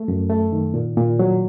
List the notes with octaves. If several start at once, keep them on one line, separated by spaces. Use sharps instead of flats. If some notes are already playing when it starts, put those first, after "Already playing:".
Already playing: A3
F#2
A3
D#3
A#2
A#2
F#3